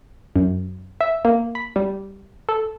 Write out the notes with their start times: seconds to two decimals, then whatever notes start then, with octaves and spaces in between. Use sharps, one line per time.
0.36 F#2
1.01 E5
1.25 A#3
1.55 B5
1.76 G3
2.49 A4